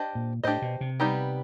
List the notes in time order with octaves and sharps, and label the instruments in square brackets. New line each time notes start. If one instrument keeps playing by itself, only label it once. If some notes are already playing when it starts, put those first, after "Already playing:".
Already playing: [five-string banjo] D4 G4 C5 D#5
[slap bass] A#2
[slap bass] A2 [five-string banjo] D4 G4 C5 D#5
[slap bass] B2
C3
[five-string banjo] G3 B3 D#4 G4